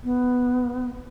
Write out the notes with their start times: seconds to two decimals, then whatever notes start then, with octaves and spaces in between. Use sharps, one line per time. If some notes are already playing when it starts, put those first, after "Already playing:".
0.04 B3